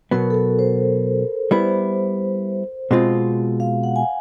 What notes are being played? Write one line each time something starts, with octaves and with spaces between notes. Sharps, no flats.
B2 F#3 B3 A#4
A4
A#4
C5
G3 B3 E4 C5
B2 G#3 C4 F4
F5
F#5
G#5